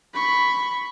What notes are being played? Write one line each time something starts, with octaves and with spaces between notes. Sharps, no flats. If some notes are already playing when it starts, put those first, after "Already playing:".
B5 C#6